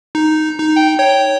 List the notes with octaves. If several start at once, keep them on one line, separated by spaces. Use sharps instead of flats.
D#4
D#4
G5
C#5 G5